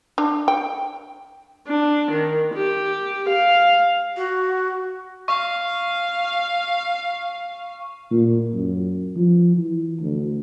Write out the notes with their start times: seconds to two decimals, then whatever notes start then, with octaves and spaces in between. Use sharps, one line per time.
0.18 D4
0.48 G5
1.67 D4
2.10 D#3
2.53 G4
3.28 F5
4.17 F#4
5.28 F5 C#6
8.11 A#2
8.54 F#2
9.16 F3
9.57 E3
10.01 D2